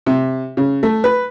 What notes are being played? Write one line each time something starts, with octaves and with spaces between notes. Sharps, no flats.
C3
C#3
A3
B4